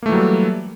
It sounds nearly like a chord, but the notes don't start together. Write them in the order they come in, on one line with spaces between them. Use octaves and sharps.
A#3 A3 E3 F#3 G3